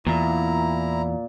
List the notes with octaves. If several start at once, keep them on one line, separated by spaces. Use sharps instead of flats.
E2 A#2 E4 A#5